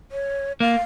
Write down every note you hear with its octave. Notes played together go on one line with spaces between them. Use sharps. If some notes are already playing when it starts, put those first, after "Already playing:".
C#5
A#3 F5